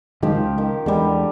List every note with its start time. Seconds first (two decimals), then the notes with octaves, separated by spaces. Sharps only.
0.22 F#2 D#3 F3 G#3 G4
0.35 C#2
0.58 D#3
0.86 E2 D3 G3 G#3